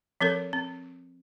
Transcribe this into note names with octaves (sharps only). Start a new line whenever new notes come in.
F3 C4 A4 A#4
C4